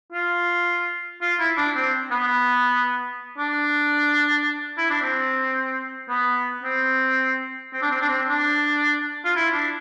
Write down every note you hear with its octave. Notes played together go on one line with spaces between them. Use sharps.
F4
F4
E4
D4
C4
B3
D4
E4
D4
C4
B3
C4
C4
D4
C4
D4
C4
D4
F4
E4
D4